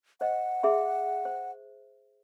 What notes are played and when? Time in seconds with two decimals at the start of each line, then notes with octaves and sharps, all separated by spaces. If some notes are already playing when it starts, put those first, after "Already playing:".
0.21 C5 D#5 F#5
0.63 G#4 E5 C6
1.25 C5